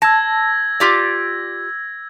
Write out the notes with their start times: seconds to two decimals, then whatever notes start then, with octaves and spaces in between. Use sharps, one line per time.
0.02 A5 E6 G#6 A#6
0.80 F4 G4 D5